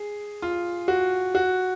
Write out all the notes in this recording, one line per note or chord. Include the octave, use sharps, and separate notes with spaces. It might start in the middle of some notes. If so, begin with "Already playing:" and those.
Already playing: G#4
F4
F#4
F#4